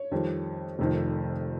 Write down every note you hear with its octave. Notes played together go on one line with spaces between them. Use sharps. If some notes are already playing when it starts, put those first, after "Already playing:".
Already playing: C#5
F2 D#3 G3
F1 F2 D#3